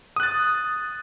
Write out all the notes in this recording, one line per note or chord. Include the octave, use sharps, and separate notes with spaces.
D#6 F#6 A6